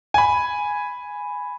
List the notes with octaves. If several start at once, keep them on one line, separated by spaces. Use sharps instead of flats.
G#5 B5